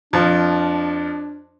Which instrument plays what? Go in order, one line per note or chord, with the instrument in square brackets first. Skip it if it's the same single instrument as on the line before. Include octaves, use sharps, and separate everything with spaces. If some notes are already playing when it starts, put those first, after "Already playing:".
[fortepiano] F2 F3 [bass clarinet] D4